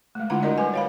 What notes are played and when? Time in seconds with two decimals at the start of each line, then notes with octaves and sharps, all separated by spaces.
0.15 G#3 A3
0.30 D3 D4 E4 F4 F#5 A#5
0.42 E4 F#4 A#4 D5 D#5
0.58 G3 B4 G#5
0.74 C#5 F5 B5